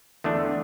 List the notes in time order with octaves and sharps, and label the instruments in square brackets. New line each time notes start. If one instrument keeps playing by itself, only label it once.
[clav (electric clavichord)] E2 D3 A3 D4